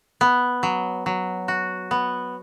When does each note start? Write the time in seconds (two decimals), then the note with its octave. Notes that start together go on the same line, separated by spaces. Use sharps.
0.21 B3
0.63 F#3
1.06 F#3
1.48 F#4
1.91 B3